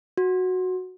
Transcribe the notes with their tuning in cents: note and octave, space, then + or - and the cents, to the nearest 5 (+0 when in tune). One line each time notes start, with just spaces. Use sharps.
F#4 -5